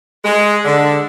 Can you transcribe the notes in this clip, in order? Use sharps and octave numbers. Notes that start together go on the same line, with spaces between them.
G#3
D3